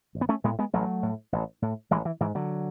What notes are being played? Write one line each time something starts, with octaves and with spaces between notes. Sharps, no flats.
A1
B3
A3 C#4
A2 G#3 B3
G#3 B3
A1 F#3 A3
A2
A1
A2
A1 E3 G#3
E3
G#2 E3
D3 F#3